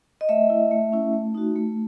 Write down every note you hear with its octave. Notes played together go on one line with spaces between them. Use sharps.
D#5
A3 E5
E4
A3
C#4 E4
A3
D#4 F#4
A3